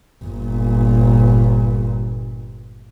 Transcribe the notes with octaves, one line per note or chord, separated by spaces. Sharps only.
G1 A#2